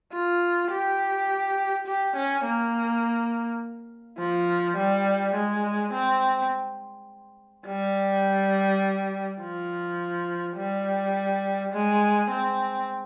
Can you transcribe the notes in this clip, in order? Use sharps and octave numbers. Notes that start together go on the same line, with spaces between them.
F4
G4
G4
C#4
A#3
F3
G3
G#3
C4
G3
F3
G3
G#3
C4